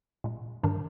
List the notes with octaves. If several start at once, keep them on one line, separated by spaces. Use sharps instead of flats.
A#2 G#3
G2 D#3 G3 D4